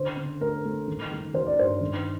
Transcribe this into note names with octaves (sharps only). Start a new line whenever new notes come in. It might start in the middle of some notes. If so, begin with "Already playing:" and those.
Already playing: D3 C5
D3
A3 A#4
A3
D#3
D#3
D#3 C5
D5
G2 C5
D#3